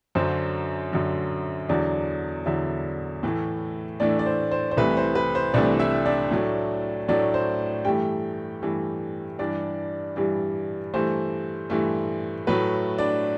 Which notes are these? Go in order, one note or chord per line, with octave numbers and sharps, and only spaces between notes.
F#2 D3 F#3 C5
F#2 D3 F#3
E2 D3 F#3 D4 D5
E2 D3 F#3 E4 E5
A2 E3 A3
A2 E3 A3 D4 D5
D5
C5
C5
C5
C2 C3 E3 A3 B4
C5
B4
C5
C2 C3 E3 A3 D4 D5
E4 E5
D4 D5
A2 F#3 A3
A2 F#3 A3 D4 D5
C5
G2 E3 A3 G4 G5
G2 E3 A3
G2 E3 G3 D4 D5
G2 E3 G3
G2 E3 A3 C5
G2 E3 A3
A2 F#3 A3 B4
D4 D5